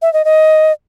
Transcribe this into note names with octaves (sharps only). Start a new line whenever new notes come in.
E5
D#5
D#5